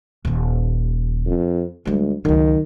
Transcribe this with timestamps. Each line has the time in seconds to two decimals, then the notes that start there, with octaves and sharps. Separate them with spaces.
0.25 D#1 D#2
1.26 F2
1.85 D2 G3 G#3
2.25 C#2 D#3 F#3